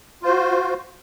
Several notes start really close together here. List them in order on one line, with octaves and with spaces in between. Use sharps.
F4 C5 F#4